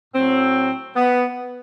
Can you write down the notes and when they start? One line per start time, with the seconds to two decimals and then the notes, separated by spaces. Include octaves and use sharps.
0.14 A2 F#3 C4
0.96 B3